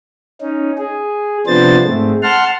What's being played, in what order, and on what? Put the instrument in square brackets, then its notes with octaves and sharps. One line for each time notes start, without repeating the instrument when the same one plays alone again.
[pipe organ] C#4 D#4
G#4
C3 F3 B3 D4 C5 A6
G#2 G#3 A3 C4
F#5 A5 C6 F6